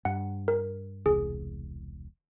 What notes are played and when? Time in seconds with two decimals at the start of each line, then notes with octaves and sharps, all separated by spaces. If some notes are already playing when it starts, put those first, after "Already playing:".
0.05 G2 F#5
0.48 A#4
1.06 E1 C2 G#4